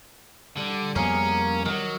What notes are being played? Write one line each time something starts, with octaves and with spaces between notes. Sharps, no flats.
D3 G3
F2 A#3 B3 C#4 G#4 A#4
D#3 F#3